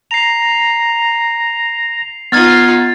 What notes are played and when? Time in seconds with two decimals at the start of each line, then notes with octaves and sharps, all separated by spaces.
0.11 A#5 C7 F7
2.32 B3 D#4 F4 F6 G#6 A6